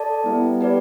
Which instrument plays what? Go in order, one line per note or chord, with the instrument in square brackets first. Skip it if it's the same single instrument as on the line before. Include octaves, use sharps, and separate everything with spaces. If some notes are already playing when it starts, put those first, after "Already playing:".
Already playing: [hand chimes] A4 D5 A5
[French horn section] G3 B3 [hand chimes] E4
[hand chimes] G4 B4 D5